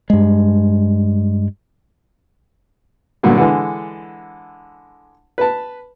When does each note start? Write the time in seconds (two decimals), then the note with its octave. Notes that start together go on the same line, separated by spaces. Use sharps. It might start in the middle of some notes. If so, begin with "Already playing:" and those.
0.10 G2 G#3
3.23 G2 A#2 D3 F#3
3.38 D3 E3 G#3
5.38 B4 A5